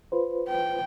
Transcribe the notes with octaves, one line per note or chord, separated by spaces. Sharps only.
F4 B4 C5
G5